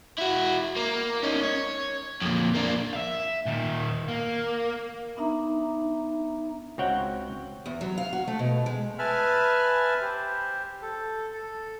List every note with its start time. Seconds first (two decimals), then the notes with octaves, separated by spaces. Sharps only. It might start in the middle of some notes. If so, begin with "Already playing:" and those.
0.18 E4 F#4
0.76 A#3
1.23 C#4 D#4
1.44 C#5
2.22 F2 A#2
2.54 A#3 D4
2.93 E5 F5
3.46 A#2 D#3
4.08 A#3
5.17 B3 D4 D#4 E5 A#5
6.78 C#2 C4 F#4 C#5 F#5 G5
7.66 E2
7.81 F#3
7.98 F5
8.13 F#4
8.28 A3
8.39 B2
8.66 G#3
8.99 B4 E5 G#5 A5 B5 F6
10.01 G4 C5
10.82 A4
11.33 A4